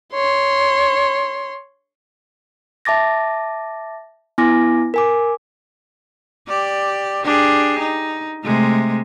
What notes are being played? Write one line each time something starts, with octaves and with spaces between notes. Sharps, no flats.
C#5 C6
E5 A5 D6 A6 A#6
B3 E4 G#5 D6 A#6
A#4 G#5 D6
G4 D5
D4 G4 G#4
D#4
C3 G#3 A3